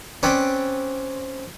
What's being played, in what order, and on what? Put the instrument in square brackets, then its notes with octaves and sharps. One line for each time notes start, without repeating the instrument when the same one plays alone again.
[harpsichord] C4 C#4 B4 D5